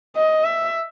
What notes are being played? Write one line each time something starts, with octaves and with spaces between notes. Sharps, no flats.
D#5
E5